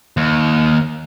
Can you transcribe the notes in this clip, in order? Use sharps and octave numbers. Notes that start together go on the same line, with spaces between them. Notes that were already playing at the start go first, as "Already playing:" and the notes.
D#2